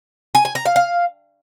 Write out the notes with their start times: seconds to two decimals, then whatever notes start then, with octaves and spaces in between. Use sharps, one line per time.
0.35 G#5
0.45 G#5
0.55 A#5
0.65 F5
0.76 F5